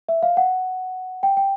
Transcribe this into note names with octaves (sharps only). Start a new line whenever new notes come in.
E5
F5
F#5
G5
G5